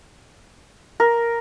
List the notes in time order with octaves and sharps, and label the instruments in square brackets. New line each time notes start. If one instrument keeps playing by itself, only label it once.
[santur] A#4